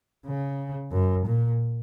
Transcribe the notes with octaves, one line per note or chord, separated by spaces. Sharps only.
C#3
F#2
A#2